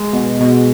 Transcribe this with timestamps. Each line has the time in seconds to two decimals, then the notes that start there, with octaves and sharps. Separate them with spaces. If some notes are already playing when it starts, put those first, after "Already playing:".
Already playing: G#3
0.13 B2
0.40 B2